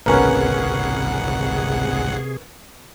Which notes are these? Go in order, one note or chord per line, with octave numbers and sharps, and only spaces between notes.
G#1 C#2 C3 A#3 B3 C#4 G#4 F#5